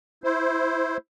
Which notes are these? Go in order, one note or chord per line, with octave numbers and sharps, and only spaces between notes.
E4 C5